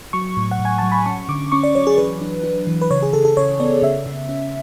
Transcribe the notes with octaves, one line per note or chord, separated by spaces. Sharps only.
F#3 C#6
A2
F#5
A2
G#5
F#3 A5
B5
C#4 C#6
D3 D6
C#4 C#6
D5
F#3 C#5
G#4
E3 B4
D4
D4
E3
B4
C#3 C#5
G#4
C#3 A4
A4
C#3 C#5
B3 D5
C#3 E5
C#3
C#4